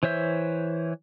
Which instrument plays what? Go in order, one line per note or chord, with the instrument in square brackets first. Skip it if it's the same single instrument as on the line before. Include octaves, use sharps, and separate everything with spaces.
[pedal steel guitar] E3 C5 C#5 E5 G6